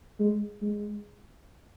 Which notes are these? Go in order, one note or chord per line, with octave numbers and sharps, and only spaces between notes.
G#3
G#3